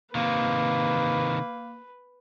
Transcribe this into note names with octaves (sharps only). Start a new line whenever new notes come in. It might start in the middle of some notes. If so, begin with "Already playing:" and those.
C3 D#3 A#3 B4